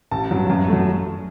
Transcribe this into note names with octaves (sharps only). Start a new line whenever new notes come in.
A1 A5
G2 F#3
F#2
F#3 A3